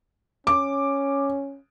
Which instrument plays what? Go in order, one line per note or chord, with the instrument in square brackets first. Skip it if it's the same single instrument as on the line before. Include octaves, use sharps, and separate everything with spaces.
[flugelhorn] C#4 [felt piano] D6